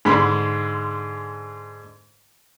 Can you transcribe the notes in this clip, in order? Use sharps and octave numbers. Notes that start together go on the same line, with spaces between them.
G#2 D3 G#3 B5 C6